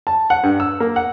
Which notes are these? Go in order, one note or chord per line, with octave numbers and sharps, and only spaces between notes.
A5
F#5
G2
E6
A#3
F#5